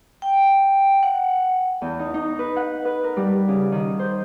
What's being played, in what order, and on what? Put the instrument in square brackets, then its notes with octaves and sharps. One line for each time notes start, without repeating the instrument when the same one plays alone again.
[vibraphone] G5
F#5
[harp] E2
D#4
D#4
B4
F#5
B4
A#4
G3
C#3
D#3
C5